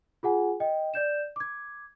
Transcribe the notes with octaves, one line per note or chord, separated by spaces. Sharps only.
F4 G#4 F#5 G#5
D#5 G5
D5 G6 E7
D6 G#6